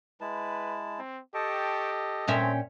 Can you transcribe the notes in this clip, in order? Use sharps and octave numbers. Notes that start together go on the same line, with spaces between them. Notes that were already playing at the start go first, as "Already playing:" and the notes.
G#3 E4 B4 A5
C4
G4 A4 D#5 G5 A5 C#6
A#2 A3 C4 C#4 E5 G5